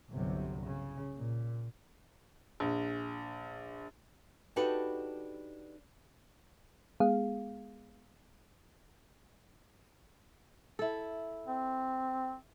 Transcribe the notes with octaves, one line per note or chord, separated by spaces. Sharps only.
G1 C2 C3 F#3
C#3
A#2
A#1
D4 D#4 F#4 G4 A4 B4
G#3 B3 G#4 F5
E4 A4
C4